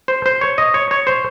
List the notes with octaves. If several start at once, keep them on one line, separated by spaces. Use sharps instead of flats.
C5
C5
C#5
D#5
C#5
C#5
C5